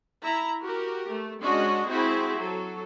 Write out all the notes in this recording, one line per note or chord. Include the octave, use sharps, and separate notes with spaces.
E4 A#5
F#4 G4 A#4
A3
G#3 C#4 D4 F#4 D#5
C4 E4 F#4 G#4
F#3 A4